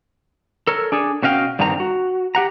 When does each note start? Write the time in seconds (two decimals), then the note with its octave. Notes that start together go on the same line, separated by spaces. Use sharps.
0.67 A4 A#4 C#5
0.92 D4 G#4 A4
1.22 B2 C#4 F#4 D#5 F5 G5
1.59 G2 D3 D#3 C4 A#5
1.80 F#4
2.35 G4 F#5 A#5